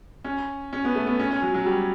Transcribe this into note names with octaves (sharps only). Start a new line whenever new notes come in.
C#4
C#4
B3
A3
B3
C#4
C#4
F#3
F#3
G3